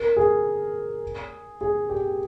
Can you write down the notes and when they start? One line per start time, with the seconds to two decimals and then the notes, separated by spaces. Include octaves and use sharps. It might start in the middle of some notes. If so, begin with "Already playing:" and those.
Already playing: A#4
0.17 G#4
1.61 G#4
1.89 G4